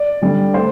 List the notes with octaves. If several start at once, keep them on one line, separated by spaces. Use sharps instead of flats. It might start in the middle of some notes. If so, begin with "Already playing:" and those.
Already playing: D5
D3 G3
A3 C5